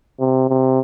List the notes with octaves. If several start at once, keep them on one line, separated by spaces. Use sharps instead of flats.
C3
C3